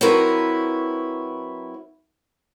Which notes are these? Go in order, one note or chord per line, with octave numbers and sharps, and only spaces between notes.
F#3 C4 E4 F#4 A#4 B4